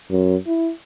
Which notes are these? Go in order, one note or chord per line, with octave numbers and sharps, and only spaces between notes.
F#2
E4